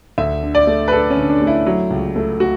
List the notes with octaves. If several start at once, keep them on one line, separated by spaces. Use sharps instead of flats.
D2 E5
D3
D5
A3
B4
D3 A4
C#4
D3
D4
A3
E4
F#3
C#2
A3
A3 F#4